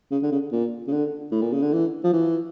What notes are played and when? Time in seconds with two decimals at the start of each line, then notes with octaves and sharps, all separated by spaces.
0.11 C#3
0.23 D3
0.32 C#3
0.52 A#2
0.88 C#3
0.92 D3
1.32 A2
1.42 A#2
1.52 C#3
1.62 D3
1.73 E3
2.04 F3
2.13 E3